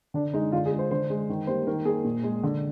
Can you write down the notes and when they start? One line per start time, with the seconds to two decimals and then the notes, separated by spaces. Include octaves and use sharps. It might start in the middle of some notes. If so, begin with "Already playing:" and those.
0.14 D3 D4
0.34 G#3 D#4
0.52 D3 F4
0.66 G#4
0.72 G#3
0.79 C5
0.91 D3 C5
1.10 G#3
1.29 D#3
1.47 G3 A#3 C5
1.67 D#3 A#4
1.85 A#3 G#4
2.04 A#2
2.23 G#3
2.43 D3